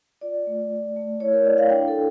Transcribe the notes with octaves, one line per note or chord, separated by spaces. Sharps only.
F4 D5
A3
A3
A3
E4 C#5
A#4
E4 D5
F5
D4 G5
A4